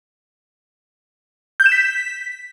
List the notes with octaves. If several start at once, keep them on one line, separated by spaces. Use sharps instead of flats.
G6
E7
B6